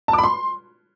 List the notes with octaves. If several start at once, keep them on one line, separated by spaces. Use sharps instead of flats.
A5
D6
B5
C6